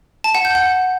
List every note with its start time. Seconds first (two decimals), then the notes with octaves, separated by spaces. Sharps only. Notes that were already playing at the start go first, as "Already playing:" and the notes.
0.24 A5
0.35 F#5
0.45 G6
0.55 F#5